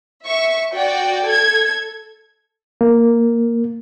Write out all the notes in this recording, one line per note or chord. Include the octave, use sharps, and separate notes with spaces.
E5 C#6
F#4 D5 G5
A4 G#6
A#3